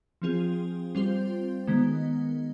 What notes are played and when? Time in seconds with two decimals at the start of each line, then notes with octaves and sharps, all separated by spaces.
0.22 F3 C4 F4 G#4
0.95 G3 C4 F4 C5
1.67 D#3 G#3 B3